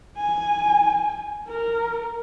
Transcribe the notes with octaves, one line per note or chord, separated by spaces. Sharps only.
G#5
A#4